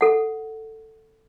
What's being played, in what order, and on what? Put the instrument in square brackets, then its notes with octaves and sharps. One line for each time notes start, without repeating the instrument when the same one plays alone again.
[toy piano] A4 F#5